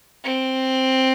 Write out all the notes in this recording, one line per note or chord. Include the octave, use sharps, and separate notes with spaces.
C4